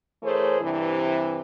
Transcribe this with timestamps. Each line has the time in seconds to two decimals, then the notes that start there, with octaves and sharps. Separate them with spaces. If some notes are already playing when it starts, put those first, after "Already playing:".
0.23 E3 A3 G#4 A#4 C5 C#5
0.61 G2 C3 E3